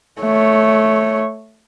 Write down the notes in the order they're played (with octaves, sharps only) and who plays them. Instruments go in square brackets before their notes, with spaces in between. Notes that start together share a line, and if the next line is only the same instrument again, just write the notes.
[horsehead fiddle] A3 C#5